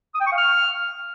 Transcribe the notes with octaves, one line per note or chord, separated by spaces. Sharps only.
D#6
G5
C#6
F5
F6